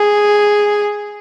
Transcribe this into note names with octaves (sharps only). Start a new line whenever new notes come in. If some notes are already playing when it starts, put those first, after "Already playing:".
Already playing: G#4